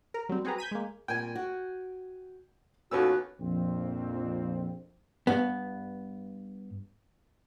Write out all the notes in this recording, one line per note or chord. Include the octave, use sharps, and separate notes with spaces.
A#4
F#3 G3 C4
C4 F#4 G#4 B4 A#5
G6 G#6 B6 D#7
G#3 A#3
A#2 G3 C4 G5 G#5
F#4
D#2 B3 C#4 F4 F#4 A4 E6
A#1 F2 C4
G2 B3